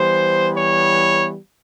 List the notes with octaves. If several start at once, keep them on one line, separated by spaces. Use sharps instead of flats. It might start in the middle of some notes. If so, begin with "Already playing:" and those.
Already playing: E3 G3 B3 C5
C#5